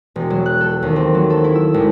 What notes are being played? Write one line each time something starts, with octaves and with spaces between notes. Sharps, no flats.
E1
F#3
F#6
A4
D#2
C4
F#3
A4
E4
E6
G#1